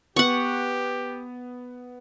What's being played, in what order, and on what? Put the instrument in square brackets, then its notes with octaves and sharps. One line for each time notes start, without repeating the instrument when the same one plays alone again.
[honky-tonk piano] B3 [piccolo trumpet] G4 [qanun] F#5 C#6